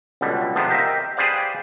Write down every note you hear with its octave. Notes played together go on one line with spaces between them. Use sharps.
C#2 B2 D3 G3
C3 F3 B3 D4
G4 A#4 C5 D#5 E5
G4 G#4 B4 C5 D5 F5